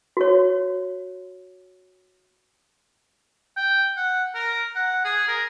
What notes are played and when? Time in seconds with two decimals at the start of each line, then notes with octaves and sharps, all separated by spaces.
0.17 F#4 C#5
3.56 G5
3.97 F#5
4.35 A#4
4.76 F#5
5.05 G#4
5.28 A#4